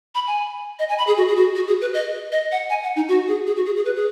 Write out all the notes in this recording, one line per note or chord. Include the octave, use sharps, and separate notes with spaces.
B5
G#5
D#5
G#5
B5
G#4
F#4
G#4
F#4
F#4
G#4
B4
D#5
D#5
F#5
G#5
F#5
D#4
F#4
G#4
G#4
F#4
G#4
G#4
B4
G#4